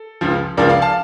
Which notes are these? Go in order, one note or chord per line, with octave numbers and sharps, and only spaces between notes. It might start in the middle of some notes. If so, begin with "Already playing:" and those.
Already playing: A4
C#2 C#3 F3
C#2 C#3 F3 A#4 D5
D5 F5
F5 A5